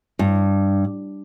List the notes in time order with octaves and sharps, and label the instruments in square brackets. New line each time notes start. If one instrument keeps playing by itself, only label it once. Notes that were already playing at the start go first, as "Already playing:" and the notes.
[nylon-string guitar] G2